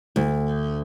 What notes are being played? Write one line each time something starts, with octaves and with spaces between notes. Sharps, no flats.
D2